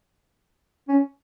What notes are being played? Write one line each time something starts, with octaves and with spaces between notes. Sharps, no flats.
C#4